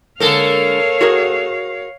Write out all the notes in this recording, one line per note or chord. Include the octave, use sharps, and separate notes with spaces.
D3 G#3 A#3 A4 A#4 C#5 F5
F#4 G#4 A#4